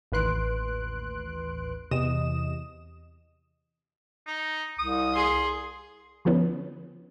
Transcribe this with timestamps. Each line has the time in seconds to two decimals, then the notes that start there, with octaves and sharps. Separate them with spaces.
0.12 A1 D#2 B4 C6 F#6 D7
1.91 E2 C3 D#5 D#6 E7
4.27 D#4
4.79 C2 D#6
5.14 G#4 C6
6.25 D3 F3 B3 C#4